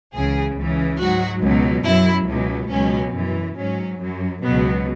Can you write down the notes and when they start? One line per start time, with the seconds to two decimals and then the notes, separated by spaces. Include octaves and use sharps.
0.14 C#2 C#3 E3 G#4
0.57 C#2 C#3 E3
0.99 G#2 F#3 F#4
1.42 C#2 B2 F#3
1.85 F#2 F#3 E4
2.28 C#2 B2 F#3
2.71 C#2 B2 F#3 C#4
3.14 F#2 E3
3.57 G#2 F#3 C#4
4.00 F#2 F#3
4.43 C#2 B2 F#3 B3